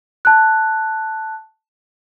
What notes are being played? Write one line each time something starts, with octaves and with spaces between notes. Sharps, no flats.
A5 F#6